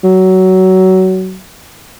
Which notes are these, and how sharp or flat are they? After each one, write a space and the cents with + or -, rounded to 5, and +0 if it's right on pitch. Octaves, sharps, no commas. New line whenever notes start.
F#3 +20